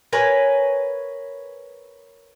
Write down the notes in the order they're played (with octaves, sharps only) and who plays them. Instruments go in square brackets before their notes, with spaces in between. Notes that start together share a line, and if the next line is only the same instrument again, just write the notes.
[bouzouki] A#4 B4 C#5 G#5